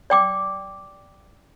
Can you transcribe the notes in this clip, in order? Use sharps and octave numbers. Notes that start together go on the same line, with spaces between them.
D5 G5 D6